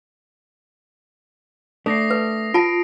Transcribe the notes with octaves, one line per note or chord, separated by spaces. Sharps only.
A3 D4 D#6 A#6 C7
B4
F4 A5 D7